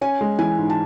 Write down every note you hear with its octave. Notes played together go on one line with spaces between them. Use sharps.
C#4 G#5
G#3
E3 G#5
G#2
A5